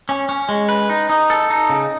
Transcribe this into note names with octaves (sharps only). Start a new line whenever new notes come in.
C#4
C#4
G#3
B4
D#4
D#4
A4
D#4
C#3